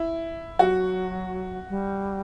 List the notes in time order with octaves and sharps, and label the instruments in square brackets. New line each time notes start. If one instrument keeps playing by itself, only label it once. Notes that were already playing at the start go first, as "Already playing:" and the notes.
Already playing: [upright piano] E4
[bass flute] F#3 [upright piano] F#4
[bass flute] G3